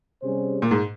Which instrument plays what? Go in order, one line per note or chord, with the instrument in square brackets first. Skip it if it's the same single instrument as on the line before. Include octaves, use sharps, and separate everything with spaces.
[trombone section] C3 G3 C#4 G#4 C5
[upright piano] A#2
G#2